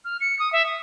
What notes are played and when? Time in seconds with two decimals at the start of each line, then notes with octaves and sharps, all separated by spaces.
0.05 F6
0.21 C#7
0.39 D#6
0.53 E5
0.66 D#6